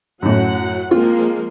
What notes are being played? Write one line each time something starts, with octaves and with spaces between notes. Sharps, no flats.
F#2 A2 F#3 F#5
F3 G#3 A#3 C4 F4